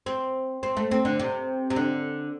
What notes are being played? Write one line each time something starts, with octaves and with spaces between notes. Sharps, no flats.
C4
C4
A3
C4
D3
C3
C3
D3